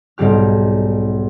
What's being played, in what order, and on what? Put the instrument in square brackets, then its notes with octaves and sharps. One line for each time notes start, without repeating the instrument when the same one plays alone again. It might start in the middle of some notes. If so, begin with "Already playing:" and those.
[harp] B1 G#2 G3 G4 F6